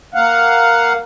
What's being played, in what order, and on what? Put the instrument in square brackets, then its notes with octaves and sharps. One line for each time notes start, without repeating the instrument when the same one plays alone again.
[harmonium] A#3 F5 F#5